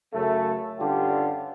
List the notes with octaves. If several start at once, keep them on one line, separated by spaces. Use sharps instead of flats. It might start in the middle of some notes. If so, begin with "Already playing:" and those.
F#2 C#3 A3
G2 D3 G3 C#4 F4 G4